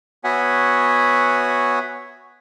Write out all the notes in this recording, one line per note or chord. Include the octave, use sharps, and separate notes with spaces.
B3 F#4 C#5 E5 F#5 G#5